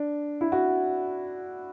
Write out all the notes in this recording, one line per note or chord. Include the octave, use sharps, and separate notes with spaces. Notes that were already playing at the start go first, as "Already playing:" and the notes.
Already playing: D4
E4
F#4